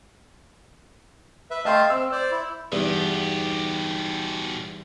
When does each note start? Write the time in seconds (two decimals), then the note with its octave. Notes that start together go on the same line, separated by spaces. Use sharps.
1.51 B4 E5
1.65 A3 D#5 F5 G5 A5 C6
1.90 C4 E6
2.12 C5 D5
2.31 E4
2.72 E2 G2 B2 B3 D#4 G4